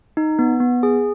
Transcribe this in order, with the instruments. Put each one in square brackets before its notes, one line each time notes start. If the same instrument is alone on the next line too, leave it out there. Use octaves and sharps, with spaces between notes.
[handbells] D#4
B3
B3
G#4